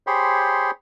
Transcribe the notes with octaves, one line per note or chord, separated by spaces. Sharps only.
G4 G#4 C5 C#5 B5 C6